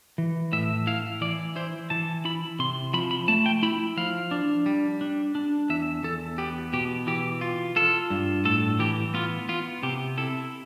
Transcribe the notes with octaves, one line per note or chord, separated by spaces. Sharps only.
E3
A2 E5
E4 F5
E3 D5
E4 C5
E3 A5
E4 B5
C3 C6
F3 B5
B5
A3 A5
G5
E4 B5
F3 F5
D4
G3
D4
D4
E2 E5
E2 A4
B3 G4
B2 G4
E3 G4
F4
F4 A4
G2
A2 A4
E3 G4
B3 F4
B3 F4
C3 G4
E4 A4